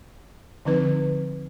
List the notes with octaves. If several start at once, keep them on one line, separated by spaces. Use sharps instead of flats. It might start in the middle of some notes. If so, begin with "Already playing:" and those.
D3 F3 C4 D#4 B4